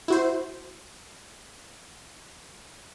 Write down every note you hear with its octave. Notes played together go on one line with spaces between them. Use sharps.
E4 F#4 C5